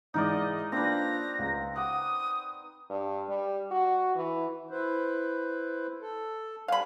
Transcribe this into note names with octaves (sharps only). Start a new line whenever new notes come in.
G#2 E3 G#3 D#4 A#4 D5 D#5
A#3 C4 D4 F4 B4 A#6
C#2
F#5 D6 D#6
G2
G3
F#4
E3
E4 B4 C5
A4
G3 F5 G#5 B5